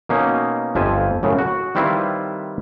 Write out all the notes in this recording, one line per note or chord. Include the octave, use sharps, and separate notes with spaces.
B2 A#3 C#4 D#4
G1 F2 F3 E5 G#5
F#2 A2 C#3
F#4
D#3 G3 C4 E4 F4 B4